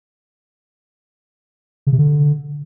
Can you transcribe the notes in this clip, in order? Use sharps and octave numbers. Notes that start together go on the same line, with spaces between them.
C#3
C3
D3